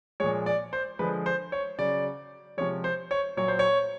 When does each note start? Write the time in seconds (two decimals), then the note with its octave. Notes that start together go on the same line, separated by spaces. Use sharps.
0.20 A#2 F3 G#3 C#5
0.46 D5
0.73 C5
0.99 D3 F3 G#3 B4
1.26 C5
1.52 C#5
1.79 C#3 F#3 D5
2.57 C3 F3 G#3 C#5
2.84 C5
3.11 C#5
3.37 A#2 F#3 C#5
3.48 C5
3.59 C#5